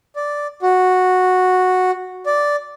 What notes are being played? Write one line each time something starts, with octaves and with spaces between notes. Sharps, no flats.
D5
F#4
D5